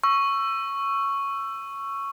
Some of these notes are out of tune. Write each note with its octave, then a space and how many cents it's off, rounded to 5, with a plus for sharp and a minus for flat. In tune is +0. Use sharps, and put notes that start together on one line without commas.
C#6 +0 E6 +20